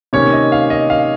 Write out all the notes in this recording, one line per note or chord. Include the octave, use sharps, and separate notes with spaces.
C3 D#3 A#3 C#4 C#5
D#5
F5
D#5
F5